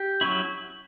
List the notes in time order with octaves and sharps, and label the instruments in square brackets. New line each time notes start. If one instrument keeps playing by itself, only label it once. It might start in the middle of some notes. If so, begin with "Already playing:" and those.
Already playing: [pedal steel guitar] G4
F#3 C#4 E4